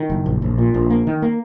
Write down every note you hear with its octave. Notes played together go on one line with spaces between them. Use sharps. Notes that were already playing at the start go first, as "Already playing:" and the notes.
Already playing: D#3
F#1
A#1
A#1
A#2
A#1
A#3
D#3
A#3